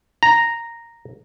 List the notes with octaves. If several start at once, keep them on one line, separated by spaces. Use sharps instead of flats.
A#5